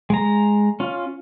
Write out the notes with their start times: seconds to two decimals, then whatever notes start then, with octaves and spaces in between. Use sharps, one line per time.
0.10 G#3 A#5
0.80 C#4 F4